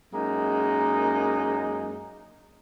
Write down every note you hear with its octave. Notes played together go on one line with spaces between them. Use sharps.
F#2 G#3 A#3 D#4